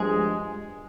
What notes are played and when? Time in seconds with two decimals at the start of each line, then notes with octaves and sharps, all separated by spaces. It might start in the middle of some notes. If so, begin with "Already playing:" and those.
Already playing: G2 F3 G#3 G#4